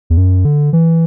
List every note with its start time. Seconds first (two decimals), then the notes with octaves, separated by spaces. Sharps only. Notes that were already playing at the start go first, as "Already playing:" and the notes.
0.10 E2
0.17 F#2
0.45 D3
0.73 E3